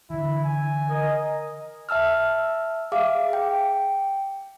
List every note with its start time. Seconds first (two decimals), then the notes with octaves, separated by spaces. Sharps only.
0.10 D3 E3 E4
0.44 G#5
0.88 A#4 D#5
1.89 E5 A5 E6 F6
2.92 G#4 E5 F5 D6
3.33 G5